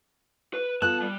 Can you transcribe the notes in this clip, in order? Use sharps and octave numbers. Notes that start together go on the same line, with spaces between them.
B4
B3 F4 A4 A5 F#6
G3